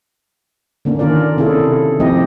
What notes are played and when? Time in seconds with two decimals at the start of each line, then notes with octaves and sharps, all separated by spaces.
0.85 D3 A#3 C#4 D4
0.99 D3 D#3 C#4 F4 A#4 D5
1.37 C3 C#4 E4 G#4 A4
2.00 F3 A3 C4 E4 G4 D#5